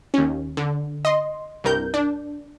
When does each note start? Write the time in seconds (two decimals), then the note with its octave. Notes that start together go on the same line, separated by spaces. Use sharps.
0.14 D#2 C#4
0.57 D3
1.05 D#5 C6
1.64 C2 G2 A#4 G6
1.94 D4